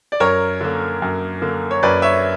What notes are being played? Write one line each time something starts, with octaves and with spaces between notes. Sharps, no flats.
D5
F#2 A#4 C#5
D3 A#3
F#2
D3 A#3
C#5
F#2 B4 D5
C#5 E5